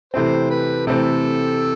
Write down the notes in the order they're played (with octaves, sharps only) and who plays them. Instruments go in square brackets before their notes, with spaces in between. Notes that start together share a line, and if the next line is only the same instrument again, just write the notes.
[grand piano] C3 E3 A3 C4 [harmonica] C5
[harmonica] B4
[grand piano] C3 E3 A3 C4 [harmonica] A4